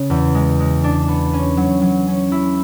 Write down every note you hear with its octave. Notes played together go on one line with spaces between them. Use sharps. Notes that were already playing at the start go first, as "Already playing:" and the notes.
Already playing: C#3
E2
G#3
G#3
D4
B3
C#4
F#3
F#3
C#4
E4